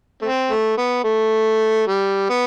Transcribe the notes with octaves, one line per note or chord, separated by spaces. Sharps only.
A3 C4
A3
B3
A3
G3
B3